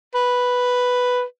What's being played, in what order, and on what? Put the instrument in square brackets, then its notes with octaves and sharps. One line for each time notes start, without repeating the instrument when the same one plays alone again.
[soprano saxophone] B4